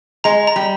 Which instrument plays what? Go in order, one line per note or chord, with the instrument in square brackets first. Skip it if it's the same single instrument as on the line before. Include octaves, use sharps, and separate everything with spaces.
[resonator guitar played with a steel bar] G#3 [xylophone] A#5
[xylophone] A#5
[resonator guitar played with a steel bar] G3